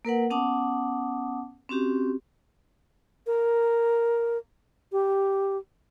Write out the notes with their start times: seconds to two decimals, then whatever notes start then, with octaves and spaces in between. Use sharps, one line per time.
0.05 A#3 A#4 B4 F#5
0.30 B3 C#4 F#5 A5 D6 D#6
1.69 C4 C#4 F#4 G4
3.26 A#4
4.92 G4